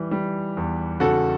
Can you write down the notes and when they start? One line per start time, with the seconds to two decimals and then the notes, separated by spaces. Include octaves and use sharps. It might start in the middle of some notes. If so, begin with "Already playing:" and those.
Already playing: E3 G3
0.11 G3
0.57 E2
1.00 C#3 F#4 A4